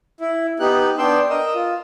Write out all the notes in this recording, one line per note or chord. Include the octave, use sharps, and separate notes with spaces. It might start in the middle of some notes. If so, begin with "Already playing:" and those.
E4
B3 D#4 G4 F#6
B3 D4 G5 C6 E6
A#4 D#5 E6
F4